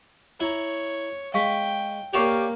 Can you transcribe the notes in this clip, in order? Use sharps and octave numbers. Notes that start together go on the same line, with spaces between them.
E4 C#5 A#5
G#3 F5 G5 C#6 B6
A#3 G4 C#5 D5 F5 C#6 E7 F7